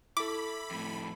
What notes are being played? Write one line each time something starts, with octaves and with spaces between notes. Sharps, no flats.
E4 A4 B5 D6
F2 A2